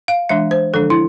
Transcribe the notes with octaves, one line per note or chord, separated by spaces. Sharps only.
F5
E3 G#3 D4 E5
C5
D3 F3 G#3 D4 A4
E4